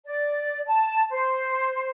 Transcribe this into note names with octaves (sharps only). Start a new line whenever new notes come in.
D5
A5
C5